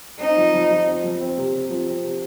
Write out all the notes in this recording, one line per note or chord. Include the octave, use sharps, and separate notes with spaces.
C4 D#4
F2
F2
F3
C4
F2
C4
C3
C3
F3
C4
C3